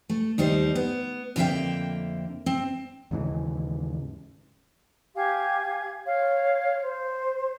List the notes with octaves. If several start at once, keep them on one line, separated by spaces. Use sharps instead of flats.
A3
D#2 G3 D#4 C5
B3
F2 D3 A#3 F4 E5 G5
C4
D#2 G#2 C#3 E3
G4 F5 G#5
C#5 F5
C5